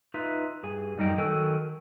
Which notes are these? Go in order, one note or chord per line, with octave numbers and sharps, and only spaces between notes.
D#4 F4 B4 E5
G2 G#4 G#5
F#2 G3 D#4 D#5 G5
D#3 F#3 A4 A#4 G5 G#5